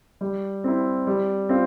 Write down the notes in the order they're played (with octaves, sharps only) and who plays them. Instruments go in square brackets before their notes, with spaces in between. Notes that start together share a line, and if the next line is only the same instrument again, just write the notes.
[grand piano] G3
C4 E4
G3
C4 F4